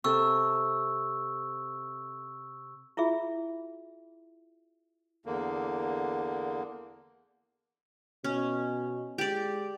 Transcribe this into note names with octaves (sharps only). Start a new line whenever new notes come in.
C3 A4 C#6 D#6 E6
E4 F4 G#4 E5
E2 D3 A#3
B2 C#4
G#3 G4 D5